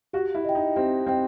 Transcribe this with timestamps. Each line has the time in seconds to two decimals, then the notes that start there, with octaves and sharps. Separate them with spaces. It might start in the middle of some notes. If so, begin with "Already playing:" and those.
0.13 F#4 G4
0.35 E4
0.45 D#5 G5
0.55 D#4
0.76 C4 G4
1.07 C4 D#5 G5